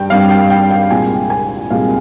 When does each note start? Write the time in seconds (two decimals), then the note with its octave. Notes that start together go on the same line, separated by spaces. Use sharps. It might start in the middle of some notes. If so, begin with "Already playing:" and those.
Already playing: G2 G3 G5
0.10 G2 G3 C4 F5
0.30 G5
0.50 G5
0.71 G5
0.90 C2 A#2 G#3 C4 G#5
1.30 G#5
1.71 C2 A#2 G#3 C4 F5